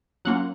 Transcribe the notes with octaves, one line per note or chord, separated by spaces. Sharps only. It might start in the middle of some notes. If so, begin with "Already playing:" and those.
F#3 A#3 C#4 F4 F#5